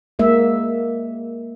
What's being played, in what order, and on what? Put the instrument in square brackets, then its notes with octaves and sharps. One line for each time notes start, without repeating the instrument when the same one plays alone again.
[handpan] G#3 A#3 E5